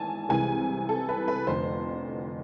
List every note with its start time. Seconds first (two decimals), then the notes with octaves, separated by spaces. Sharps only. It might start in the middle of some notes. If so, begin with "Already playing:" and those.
Already playing: G#1 G#2 E3 G#5 A5
0.29 C2 C3 E3 G#3 G#5
0.89 A4
1.09 B4
1.28 B4
1.47 F1 F2 D3 C5